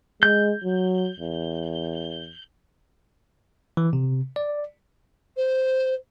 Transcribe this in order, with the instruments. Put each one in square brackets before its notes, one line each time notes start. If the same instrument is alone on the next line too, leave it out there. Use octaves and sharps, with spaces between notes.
[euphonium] G#3 [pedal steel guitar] G6
[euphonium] F#3
E2
[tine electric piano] E3
C3
D5
[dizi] C5